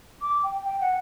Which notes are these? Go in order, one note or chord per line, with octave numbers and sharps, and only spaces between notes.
D6
G5
G5
F#5